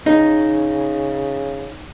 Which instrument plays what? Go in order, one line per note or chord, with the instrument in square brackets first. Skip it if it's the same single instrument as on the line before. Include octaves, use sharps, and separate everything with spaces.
[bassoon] C#3 [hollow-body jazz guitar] D#4